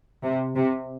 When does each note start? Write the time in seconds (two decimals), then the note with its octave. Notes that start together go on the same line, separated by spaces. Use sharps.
0.23 C3
0.55 C3